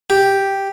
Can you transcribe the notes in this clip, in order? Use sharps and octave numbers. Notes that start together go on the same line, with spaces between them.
G4